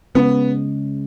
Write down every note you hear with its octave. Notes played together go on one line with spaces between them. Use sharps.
C#3 G#3 B3 C#4